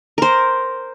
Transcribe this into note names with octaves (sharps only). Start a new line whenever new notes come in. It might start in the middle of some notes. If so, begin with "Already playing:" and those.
A#4 C5